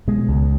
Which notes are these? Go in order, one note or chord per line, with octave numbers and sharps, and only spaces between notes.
B2 G#3
C#2